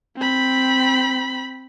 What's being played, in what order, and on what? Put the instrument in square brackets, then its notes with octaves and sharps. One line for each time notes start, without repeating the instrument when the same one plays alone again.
[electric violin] C4 B5